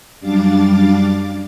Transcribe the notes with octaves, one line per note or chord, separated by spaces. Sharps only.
F#2 G3 D4 F5 D6 A6